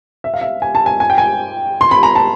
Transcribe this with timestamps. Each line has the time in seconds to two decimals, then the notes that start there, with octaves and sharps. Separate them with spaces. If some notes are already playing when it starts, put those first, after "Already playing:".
0.24 E5
0.34 F5
0.41 E5
0.62 G#5
0.75 A5
0.86 G#5
1.00 G#5
1.10 G5
1.18 G#5
1.81 C6
1.91 B5
2.03 A#5
2.15 A5